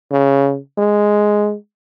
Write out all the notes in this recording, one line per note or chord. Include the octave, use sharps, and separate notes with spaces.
C#3
G#3